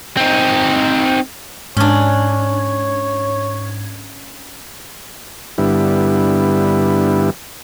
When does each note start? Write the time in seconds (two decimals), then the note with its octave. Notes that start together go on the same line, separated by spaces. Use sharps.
0.17 C4 D#4
1.77 G#2 C#4 D4 C#5 G#6
5.58 G2 D3 G3 B3 E4